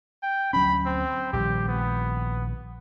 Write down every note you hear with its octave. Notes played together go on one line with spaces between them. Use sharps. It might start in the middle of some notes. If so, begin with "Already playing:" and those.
G5
D2 F#3 C#4 B5
C4
A#1 D#3 G3 G4
B3